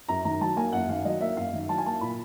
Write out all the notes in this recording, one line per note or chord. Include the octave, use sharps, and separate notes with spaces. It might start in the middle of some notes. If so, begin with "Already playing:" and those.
F#2 A#5
D#3 A#5
F#3 A5
A#3 G#5
F#2 F#5
D#3 F5
F#3 D#5
A#3 E5
F#2 F5
D#3
F#3 A5
G#5
A#3 A5
A#2 B5